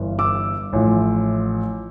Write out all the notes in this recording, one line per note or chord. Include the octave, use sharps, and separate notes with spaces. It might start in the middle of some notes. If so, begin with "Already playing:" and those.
Already playing: G1 G2 E3
D6 E6
A1 A2 F3